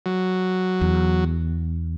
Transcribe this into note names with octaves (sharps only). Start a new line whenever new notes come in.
F#3
E2